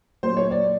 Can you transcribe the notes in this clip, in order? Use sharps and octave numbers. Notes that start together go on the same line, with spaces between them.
A#2 F#3 A#3 C5
C#5
D5